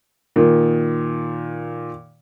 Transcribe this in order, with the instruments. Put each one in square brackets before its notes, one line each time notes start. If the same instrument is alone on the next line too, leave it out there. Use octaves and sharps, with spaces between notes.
[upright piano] A#2 D#3